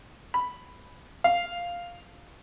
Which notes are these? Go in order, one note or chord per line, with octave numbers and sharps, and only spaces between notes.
B5
F5